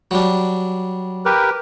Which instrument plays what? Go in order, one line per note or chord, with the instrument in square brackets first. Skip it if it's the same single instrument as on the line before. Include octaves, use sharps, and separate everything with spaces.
[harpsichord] F#3 G3 D4
[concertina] G4 A#4 B4